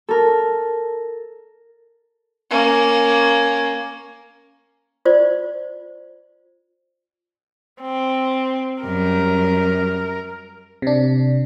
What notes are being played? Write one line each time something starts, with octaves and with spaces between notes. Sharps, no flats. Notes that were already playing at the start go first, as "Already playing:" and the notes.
A4 A#4
A#3 C#4
F4 C5 D5
C4
F#2 G3 A#4
C3 D4